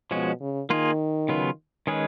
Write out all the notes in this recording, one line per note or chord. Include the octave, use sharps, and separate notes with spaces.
B2 F3 G#3 C#4 F#4
C#3
D#3 A#3 F4 G#4
C#3 F#3 B3 F4
D#3 G#3 C#4 G#4 B4